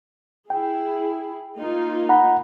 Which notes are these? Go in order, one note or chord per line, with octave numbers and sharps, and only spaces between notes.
E4 G#4 G5
A#3 D#4 F4
F#5 A#5 B5